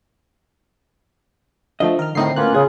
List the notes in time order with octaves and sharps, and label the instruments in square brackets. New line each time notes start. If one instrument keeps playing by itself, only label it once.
[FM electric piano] D3 F3 A3 [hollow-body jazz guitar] D#5
[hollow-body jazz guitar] D#3 [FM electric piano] A#4 F6
[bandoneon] A2 D#3 [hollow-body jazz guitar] D3 A3 C4 [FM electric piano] D#4 C7
[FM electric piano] A2 B3 F#6 [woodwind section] A#3 C#4 [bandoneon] F4
[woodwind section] C#3 [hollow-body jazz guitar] G#4